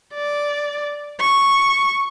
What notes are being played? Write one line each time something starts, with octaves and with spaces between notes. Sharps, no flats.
D5
C#6